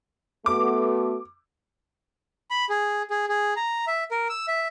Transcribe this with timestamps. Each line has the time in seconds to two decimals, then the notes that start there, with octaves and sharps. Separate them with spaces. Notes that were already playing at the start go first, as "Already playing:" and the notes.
0.46 A3 B3 F#4 D6
2.51 B5
2.69 G#4
3.10 G#4
3.29 G#4
3.56 A#5
3.87 E5
4.11 A#4
4.30 E6
4.48 E5